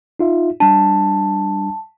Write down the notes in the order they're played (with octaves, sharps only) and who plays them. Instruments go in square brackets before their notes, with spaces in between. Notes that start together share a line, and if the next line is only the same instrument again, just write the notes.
[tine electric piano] D#4 F4 E5
[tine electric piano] G3 D4 [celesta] A5